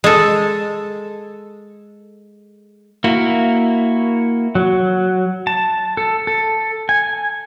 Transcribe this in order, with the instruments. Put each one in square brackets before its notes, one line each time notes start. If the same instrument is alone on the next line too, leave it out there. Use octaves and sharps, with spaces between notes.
[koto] G#3 A4
[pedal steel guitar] A#3 E4 F#4
F#3
A5
A4
A4
G#5